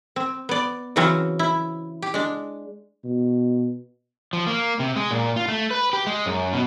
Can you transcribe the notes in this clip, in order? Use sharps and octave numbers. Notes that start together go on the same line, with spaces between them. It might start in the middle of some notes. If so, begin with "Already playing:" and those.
C4
B3 D5
C#3 E3 F#3 C4 C#4 F#4
E4
G4
G#3 D4
B2
F3
A#3
C3
G#3
A#2
F4
A3
B4
G4
G#3
F#2
B2